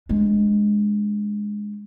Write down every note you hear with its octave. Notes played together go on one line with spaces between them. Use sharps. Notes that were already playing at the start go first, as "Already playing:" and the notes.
G#3 D4